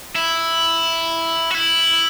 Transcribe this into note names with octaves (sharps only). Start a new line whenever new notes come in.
E4
F#4
E4